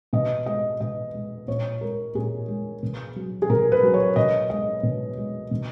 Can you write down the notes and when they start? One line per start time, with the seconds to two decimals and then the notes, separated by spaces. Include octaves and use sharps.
0.13 B2 D#5
0.46 G#3 D#5
0.80 B2 D#5
1.14 G#3
1.48 A#2 C#5
1.81 G#3 A#4
2.15 A#2 G#4
2.48 G#3
2.83 B2
3.16 F#3
3.42 G#4
3.49 B2 A#4
3.72 B4
3.83 F#3
3.94 C#5
4.16 B2 D#5
4.50 G#3 D#5
4.83 B2
5.17 G#3
5.51 B2